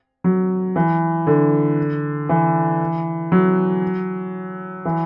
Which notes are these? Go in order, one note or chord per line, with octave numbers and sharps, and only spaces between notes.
F#3
E3
D3
E3
F#3
E3